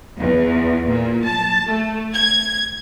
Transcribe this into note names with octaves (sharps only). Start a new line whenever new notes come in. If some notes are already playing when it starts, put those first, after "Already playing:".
E2
A#2
A5
A3
G#6